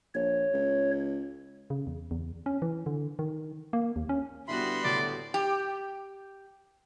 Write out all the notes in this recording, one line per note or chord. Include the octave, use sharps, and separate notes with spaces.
A#1 C#5
C#2
C#3
E2
E2
C#4
E3
D3
D#3
A#3
D#2
C#4
D3 G3 B3 E4 F#4 B5 C6
D2 A2 D5
G4